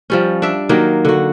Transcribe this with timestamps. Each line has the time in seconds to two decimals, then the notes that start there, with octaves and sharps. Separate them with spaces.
0.10 F3 G3 C#4
0.42 D4 E5
0.69 D#3 F#3 A#3 G4
1.05 D3 F#4